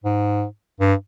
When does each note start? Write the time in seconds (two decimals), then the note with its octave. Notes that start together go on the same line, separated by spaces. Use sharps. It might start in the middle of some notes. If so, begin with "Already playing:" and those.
0.04 G#2
0.80 G2